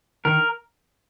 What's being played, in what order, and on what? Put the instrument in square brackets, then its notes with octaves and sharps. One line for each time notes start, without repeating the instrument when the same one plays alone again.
[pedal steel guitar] D#3 A#4